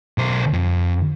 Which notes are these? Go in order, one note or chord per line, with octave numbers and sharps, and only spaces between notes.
B1 C5
F2